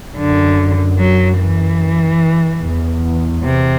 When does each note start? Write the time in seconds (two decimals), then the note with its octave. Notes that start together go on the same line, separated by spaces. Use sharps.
0.16 F#2 D3
0.99 F#3
1.39 E3
2.63 E2
3.44 C3